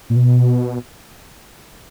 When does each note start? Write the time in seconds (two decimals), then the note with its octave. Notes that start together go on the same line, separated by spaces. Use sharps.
0.10 A#2
0.16 B2